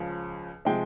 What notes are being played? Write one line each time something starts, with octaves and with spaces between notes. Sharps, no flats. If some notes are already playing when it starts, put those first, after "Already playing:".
Already playing: C#2 C#3 F3
C3 F3 G#3 G5